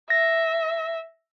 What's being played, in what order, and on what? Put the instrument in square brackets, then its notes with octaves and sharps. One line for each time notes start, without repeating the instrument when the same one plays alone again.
[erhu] E5 [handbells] A#6